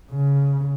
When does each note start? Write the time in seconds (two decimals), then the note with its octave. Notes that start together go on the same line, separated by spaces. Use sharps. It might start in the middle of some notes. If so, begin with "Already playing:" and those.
0.11 C#3